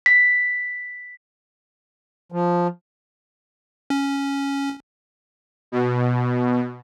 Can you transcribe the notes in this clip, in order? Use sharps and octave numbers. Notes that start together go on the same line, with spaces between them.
B6
F3
C#4
B2